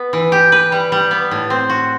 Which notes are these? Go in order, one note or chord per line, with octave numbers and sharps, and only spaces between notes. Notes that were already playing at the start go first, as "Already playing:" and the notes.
Already playing: B3
E3
G4
B4
G3
G3
B3
A2
C4
F#4